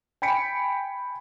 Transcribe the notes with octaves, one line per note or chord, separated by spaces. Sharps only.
G5 G#5 B5 B6 C#7 D7